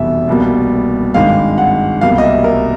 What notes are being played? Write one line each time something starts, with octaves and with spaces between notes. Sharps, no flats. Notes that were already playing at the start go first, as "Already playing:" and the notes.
Already playing: F1 E2 B2 G3 E5
C2 B2 G3 A#3
G#1 G2 D#3 G#3 F5
F#5
C2 B2 G3 A#3 F5
D#5
E5
A#4